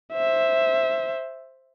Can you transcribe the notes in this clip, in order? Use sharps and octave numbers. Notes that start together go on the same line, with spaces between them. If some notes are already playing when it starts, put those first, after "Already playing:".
C5 E5